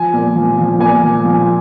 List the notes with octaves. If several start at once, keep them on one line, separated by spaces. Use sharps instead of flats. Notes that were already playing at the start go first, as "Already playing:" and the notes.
Already playing: F3 G#5
A#2
F3
F3
A#2 G#5
F3
F3